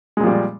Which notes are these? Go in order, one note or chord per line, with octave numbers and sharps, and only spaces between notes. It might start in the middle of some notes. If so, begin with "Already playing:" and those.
A#2 F3 G3 G#3